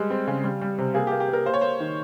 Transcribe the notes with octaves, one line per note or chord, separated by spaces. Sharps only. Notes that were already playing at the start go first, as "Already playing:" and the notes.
Already playing: G3 G#3
C4
C#3
G3
G3
C3
A#3 G#4
G4
A#3
G4
A#3
A#4
A#3 C5
C#5
A#3 C5
D#3